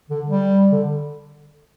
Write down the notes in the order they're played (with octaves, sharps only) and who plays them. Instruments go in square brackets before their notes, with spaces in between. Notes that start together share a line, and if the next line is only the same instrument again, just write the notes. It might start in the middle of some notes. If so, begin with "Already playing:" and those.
[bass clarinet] D3
G3
D3